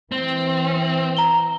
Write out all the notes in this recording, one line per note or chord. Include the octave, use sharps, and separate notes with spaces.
E3 C4
A#5 G7